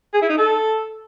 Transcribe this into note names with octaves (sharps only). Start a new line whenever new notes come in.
G#4
E4
D#4
A4